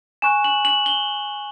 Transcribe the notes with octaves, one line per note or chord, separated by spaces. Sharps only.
G#5 C#6 F#6 E7
F#7
F#7
G7